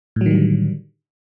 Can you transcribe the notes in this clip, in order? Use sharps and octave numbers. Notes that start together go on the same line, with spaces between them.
A2 D3 D#3 F#3 G3